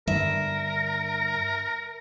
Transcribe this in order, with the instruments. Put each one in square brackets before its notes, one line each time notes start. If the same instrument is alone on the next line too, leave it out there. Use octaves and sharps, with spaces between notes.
[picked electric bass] G2 D3 [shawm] A#4 [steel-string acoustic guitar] E5